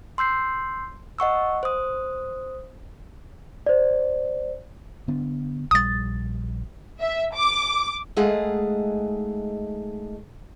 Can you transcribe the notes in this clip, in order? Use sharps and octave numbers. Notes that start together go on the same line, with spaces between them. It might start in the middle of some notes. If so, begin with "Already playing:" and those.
C6 E6 G6 C7
D#5 F#5 C#6 E6
C5 D#6
C5 D5
D3 B3 D4
A#1 G3 D#6 A6
E5
D6
G#3 A3 D#4 G#4 F5 F#5